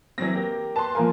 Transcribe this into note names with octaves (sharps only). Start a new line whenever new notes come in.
E3 F#3 C4 A#6
A#3 G4
B4 A5 C6
F3 A#3 A#4 G#5